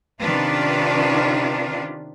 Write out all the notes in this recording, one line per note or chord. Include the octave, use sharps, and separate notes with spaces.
C3 D#3 C#4 D4 F4 B4